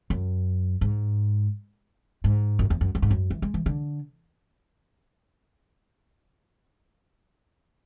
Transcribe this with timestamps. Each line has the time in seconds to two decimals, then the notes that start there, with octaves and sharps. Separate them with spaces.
0.10 F#2
0.81 G#2
2.24 G#2
2.59 F#2
2.70 E2
2.81 F#2
2.95 F#2
3.02 G#2
3.10 F#2
3.31 E3
3.42 G#3
3.54 E3
3.66 D3